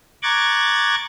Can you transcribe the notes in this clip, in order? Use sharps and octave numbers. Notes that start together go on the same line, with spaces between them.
A#5 C#6 D6 F#6 G#6 A6